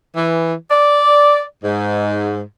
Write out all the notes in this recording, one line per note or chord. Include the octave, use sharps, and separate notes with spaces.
E3
D5
G#2